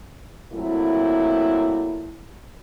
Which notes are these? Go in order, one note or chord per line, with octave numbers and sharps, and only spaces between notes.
A#2 F#3 A3 C4 E4